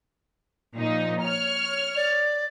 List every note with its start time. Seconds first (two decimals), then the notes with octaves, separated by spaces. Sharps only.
0.73 A#2 F3 D#4
1.23 C#5 F6
1.96 D5